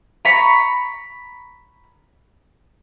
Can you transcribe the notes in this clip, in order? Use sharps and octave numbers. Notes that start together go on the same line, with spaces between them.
A#5 B5 C#6